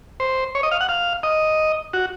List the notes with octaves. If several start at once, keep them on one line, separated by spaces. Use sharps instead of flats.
C5
C#5
D#5
F5
F#5
F5
D#5
F#4